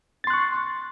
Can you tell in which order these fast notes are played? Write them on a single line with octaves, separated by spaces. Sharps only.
A6 C6 F#6 C#6